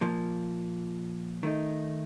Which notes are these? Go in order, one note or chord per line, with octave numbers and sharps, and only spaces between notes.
A#2 F3 A#3
D#3 A3 D#4